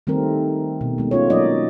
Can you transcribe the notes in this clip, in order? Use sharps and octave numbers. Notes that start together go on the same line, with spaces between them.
D#3 G3 A3 C4 A#4
B2
G#3 A3
C#4 F4 C#5
F#3 A#3 D#4 D5 D#5